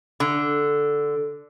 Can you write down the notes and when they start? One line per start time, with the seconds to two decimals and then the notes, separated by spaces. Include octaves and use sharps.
0.20 D3